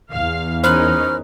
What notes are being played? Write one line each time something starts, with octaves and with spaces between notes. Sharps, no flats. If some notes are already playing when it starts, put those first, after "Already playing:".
E2 F5
C#4 D#4 A#4 C5 B5 F6 F#6